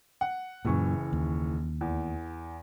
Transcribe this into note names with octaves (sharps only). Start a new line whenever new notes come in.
F#5
F#1 F#2 A#2 E3 C#6
D#2
E2